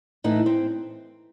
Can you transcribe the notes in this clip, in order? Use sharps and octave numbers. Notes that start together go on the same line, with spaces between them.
A2 E3 D#4
C4